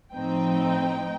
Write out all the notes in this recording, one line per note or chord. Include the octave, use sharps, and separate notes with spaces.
A2 F3 C4 D#4 G5